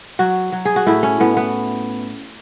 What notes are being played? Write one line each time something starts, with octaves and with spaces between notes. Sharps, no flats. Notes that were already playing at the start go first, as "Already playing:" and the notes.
F#3 F#4
F#3
G#4
F#4
A2 E4
C#4
A2 B3
B3